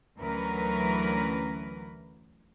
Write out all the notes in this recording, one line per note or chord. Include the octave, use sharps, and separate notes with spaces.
D2 E3 F#3 C#4 A#4 B4